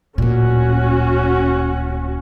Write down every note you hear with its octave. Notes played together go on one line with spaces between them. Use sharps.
D1 A#2 C#4 F#4